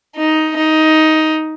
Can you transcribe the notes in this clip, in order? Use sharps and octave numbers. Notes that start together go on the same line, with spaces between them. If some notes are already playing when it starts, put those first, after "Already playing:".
D#4
D#4